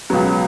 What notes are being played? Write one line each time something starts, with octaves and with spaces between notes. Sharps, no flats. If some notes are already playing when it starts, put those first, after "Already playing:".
C#2 B2 F#3 B3